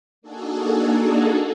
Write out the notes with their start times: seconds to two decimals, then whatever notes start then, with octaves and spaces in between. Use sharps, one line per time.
0.22 A#3 D4 D#4 F#4 G#4 A4